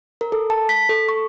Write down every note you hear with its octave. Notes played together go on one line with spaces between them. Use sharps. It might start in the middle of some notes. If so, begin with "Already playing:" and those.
A#4
A4
A5
B6
A4
C#6